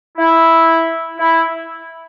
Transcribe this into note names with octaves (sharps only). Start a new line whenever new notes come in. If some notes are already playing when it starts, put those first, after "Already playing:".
E4
E4